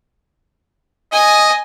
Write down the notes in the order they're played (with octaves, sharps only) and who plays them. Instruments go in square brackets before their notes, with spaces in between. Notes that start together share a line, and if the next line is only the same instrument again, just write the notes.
[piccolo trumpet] D#5 [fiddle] G#5